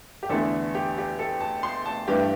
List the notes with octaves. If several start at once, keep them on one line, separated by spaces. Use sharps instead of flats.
G4
E2 D3 A3 A4
G4
G4
A4
A5
C6
A5
G2 E3 A3 G4